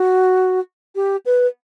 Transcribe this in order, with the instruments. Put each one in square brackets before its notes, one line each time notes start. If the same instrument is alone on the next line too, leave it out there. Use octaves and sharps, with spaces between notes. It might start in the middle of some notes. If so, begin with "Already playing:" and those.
Already playing: [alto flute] F#4
G4
B4